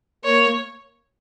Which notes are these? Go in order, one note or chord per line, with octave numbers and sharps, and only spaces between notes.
A#3 C#5